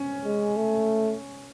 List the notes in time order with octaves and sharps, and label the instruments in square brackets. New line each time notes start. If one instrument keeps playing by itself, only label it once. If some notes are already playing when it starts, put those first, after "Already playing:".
Already playing: [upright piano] C#4
[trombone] G#3
A3